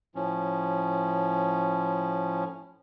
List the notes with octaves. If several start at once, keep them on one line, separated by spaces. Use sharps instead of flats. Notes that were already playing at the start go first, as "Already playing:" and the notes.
A2 F3 C#4